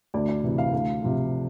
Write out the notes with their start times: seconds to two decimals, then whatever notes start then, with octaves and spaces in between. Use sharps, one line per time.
0.14 D2 D5
0.29 D5
0.43 C3 E3
0.58 F5
0.73 D2 F5
1.03 C3 F3